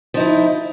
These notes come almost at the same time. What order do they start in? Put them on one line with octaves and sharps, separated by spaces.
F3 D#4 E4